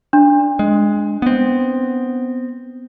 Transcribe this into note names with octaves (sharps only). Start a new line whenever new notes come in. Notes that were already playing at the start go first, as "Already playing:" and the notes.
D4
G#3
B3 C4